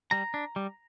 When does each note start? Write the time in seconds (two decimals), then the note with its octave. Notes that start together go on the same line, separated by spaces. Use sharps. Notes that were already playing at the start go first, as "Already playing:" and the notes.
0.11 G3 A#5
0.34 D4
0.56 G3